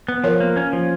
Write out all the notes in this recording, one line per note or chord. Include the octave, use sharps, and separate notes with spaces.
B3
F3 A#4 C#5
A#3
C#4
F3